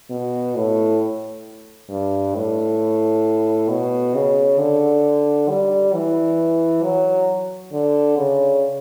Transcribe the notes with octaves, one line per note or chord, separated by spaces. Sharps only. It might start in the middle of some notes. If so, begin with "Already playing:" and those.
B2
A2
G2
A2
B2
C#3
D3
G3
E3
F#3
D3
C#3